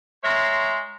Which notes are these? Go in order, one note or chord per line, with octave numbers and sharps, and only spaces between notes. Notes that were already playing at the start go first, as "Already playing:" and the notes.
G#3 C#5 E5 A#5 C6